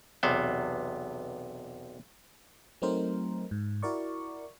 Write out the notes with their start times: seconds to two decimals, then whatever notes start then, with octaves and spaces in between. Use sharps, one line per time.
0.23 B1 E2 C3 B3 C5
2.82 F#3 A3 C4 D#4 A#4 C5
3.51 G#2
3.82 E4 F#4 A#4 D5 C#6